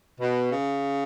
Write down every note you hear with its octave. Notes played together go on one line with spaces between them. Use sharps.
B2
C#3